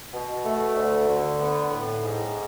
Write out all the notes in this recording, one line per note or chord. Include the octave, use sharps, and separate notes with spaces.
B2
A3
D2
D3
B3
A2
G#2